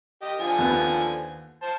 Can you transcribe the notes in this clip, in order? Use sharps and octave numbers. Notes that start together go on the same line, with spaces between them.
G4 D#5
D3 F3 G#5
D#2 B3
C5 A5